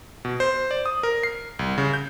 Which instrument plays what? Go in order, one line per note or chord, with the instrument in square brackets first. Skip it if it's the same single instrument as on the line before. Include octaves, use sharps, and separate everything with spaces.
[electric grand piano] B2
C5
D5
D#6
A#4
C7
C2
C#3
G6